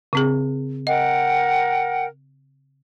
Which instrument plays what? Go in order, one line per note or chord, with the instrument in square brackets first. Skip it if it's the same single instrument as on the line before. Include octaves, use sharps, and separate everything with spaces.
[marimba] C#3 C4 G#4
[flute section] A#4 F#5 G5 [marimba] D#5